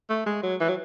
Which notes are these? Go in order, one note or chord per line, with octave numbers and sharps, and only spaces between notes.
A3
G#3
F#3
E3
F#3